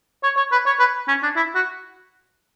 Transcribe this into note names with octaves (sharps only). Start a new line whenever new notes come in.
C#5
C#5
B4
C#5
B4
C#4
D4
E4
F#4